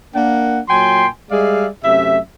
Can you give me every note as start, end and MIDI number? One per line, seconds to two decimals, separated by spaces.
0.15 0.59 58
0.15 0.59 62
0.15 0.59 78
0.69 1.06 46
0.69 1.06 54
0.69 1.06 79
0.69 1.06 80
0.69 1.06 84
1.31 1.67 55
1.31 1.67 56
1.31 1.67 68
1.31 1.67 74
1.31 1.67 76
1.31 1.67 77
1.84 2.19 42
1.84 2.19 48
1.84 2.19 57
1.84 2.19 76